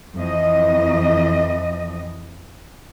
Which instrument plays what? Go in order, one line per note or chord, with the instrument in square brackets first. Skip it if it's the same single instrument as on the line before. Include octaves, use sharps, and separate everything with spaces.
[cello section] F2 E3 D#5